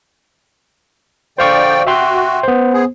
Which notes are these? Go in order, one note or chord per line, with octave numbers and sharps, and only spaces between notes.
D3 C5 D5 F5 G5 C#6
F#4 E5 G5 C6
B3 C5
G#4